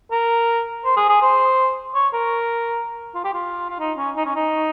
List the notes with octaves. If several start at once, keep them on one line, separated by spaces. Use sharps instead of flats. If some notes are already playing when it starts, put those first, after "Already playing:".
A#4
C5
G#4
G#4
C5
C#5
A#4
F4
G4
F4
F4
D#4
C#4
D#4
C#4
D#4